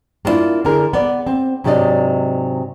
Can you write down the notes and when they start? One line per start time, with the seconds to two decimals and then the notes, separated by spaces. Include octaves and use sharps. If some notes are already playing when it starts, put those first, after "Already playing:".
0.25 A#3 B3 D4 E4 F4
0.65 D3 E4 G#4 A#4
0.93 B3 D5
1.26 C4
1.64 G#2 C3 F#3 D4 D5 D#5